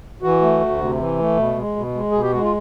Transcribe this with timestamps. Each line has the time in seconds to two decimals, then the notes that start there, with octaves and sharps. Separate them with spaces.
0.22 E3 F#4
0.41 A3
0.61 D2
0.81 C3
0.99 E3
1.19 A3
1.37 B2
1.57 G#3
1.76 B2
1.94 G#3
2.11 B2 G#4
2.22 G4
2.32 G#3 F#4
2.42 F4